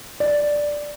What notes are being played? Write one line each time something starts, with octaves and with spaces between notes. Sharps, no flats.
D5